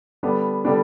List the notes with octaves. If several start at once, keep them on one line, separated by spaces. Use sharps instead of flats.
D3 G3 B3 D4
D3 G3 B3 D4